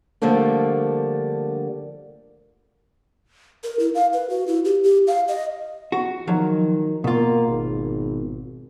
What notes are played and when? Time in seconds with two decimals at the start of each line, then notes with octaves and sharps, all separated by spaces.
0.22 D3 F3 G3 A3 A#3 D4
3.64 A#4
3.79 E4
3.95 F5
4.13 B4
4.30 F#4
4.48 E4
4.65 G4
4.84 G4
5.07 F5
5.28 D#5
5.92 F#4
6.27 D#3 F3 F#3
7.04 B2 A#3 F4
7.47 G#1